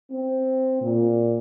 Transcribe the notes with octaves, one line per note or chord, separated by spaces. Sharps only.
C4
A#2